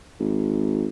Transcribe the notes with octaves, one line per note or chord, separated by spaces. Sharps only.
G#1